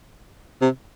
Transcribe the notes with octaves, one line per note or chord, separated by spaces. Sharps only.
C3